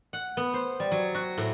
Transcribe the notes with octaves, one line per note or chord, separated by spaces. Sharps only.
F#5
B3
C5
G3
F#3
F#4
A2